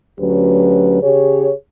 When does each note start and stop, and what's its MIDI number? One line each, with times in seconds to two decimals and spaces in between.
0.20 1.00 38
0.20 1.00 54
0.20 1.00 61
0.20 1.00 67
0.20 1.00 71
1.03 1.52 49
1.03 1.52 67
1.03 1.52 68
1.03 1.52 73